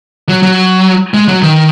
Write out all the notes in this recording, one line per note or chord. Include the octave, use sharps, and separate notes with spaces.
F#3
F#3
G#3
F#3
D#3